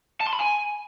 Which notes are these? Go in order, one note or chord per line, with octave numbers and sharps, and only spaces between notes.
A5
C6
B5
G#5